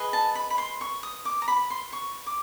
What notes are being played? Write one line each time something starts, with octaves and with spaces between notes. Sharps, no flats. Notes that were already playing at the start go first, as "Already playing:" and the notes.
Already playing: G#4 B4 D#5
A5
B5
B5
C6
C#6
D#6
D6
A#5
B5
C6
C#6
D6